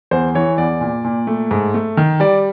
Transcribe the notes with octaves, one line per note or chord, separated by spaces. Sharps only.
E2 C5
E3 C#5
E2 D5
A#2
A#2
A3
G#2
A3
D#3
G3 D5